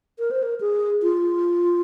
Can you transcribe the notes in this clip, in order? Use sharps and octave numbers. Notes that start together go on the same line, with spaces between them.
A#4
C5
A#4
G#4
F4